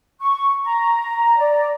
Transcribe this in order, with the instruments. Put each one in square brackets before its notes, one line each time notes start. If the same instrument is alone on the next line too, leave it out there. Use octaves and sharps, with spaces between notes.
[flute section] C#6
A#5
D5